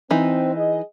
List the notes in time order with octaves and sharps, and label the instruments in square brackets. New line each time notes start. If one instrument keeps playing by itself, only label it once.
[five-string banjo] E3 D#4 [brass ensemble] C4
[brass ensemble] G#4 D#5